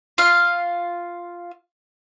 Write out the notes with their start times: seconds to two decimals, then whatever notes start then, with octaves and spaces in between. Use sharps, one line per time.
0.18 F4 F5